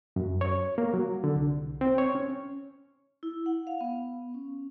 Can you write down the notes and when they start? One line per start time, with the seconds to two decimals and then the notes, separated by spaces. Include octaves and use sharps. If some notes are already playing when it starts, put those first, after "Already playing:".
0.16 F#2
0.41 C#5
0.78 A#3
0.94 F#3
1.24 D3
1.36 C2
1.81 C4
1.98 C#5
2.15 C#4
3.23 E4
3.46 F#5
3.67 F5
3.81 B3
4.34 C#4